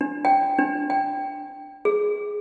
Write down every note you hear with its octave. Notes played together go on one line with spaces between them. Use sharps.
D4
G5
D4
G5
G#4